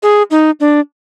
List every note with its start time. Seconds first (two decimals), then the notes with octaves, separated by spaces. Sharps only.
0.03 G#4
0.31 D#4
0.60 D4